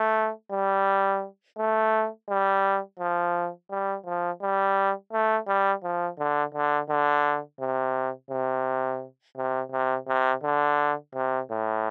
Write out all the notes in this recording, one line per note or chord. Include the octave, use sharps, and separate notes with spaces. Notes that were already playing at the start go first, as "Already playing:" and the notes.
Already playing: A3
G3
A3
G3
F3
G3
F3
G3
A3
G3
F3
D3
D3
D3
C3
C3
C3
C3
C3
D3
C3
A2